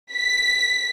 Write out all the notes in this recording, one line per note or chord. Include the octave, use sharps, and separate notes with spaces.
B6